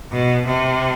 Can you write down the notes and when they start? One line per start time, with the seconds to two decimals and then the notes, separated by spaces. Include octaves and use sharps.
0.12 B2
0.46 C3